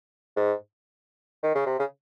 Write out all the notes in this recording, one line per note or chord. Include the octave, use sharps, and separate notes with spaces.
G#2
D#3
C#3
C3
C#3